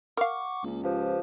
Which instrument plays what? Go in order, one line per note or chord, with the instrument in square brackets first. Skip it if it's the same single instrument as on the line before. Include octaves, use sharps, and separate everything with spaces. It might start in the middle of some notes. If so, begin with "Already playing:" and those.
[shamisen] A#4 F5 [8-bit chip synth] F#5 C#6 D6
[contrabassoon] C#2 [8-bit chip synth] A#3 C#4
[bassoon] F3 [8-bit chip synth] G4 B4 C5